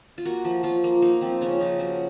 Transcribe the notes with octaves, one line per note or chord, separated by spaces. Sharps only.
F4
A#3 F#4
F3
F3 F4
A#3
A#3 D#4
F3 C4
C#3 C#4
F3 D#4
F#3 C#4